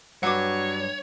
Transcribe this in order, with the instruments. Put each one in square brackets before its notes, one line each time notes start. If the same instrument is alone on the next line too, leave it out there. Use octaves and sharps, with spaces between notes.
[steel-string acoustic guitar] G2 [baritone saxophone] F#3 [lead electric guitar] C#5 [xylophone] F#5 D6